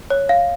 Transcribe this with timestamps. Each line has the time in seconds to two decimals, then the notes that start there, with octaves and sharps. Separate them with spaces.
0.10 C#5
0.29 F5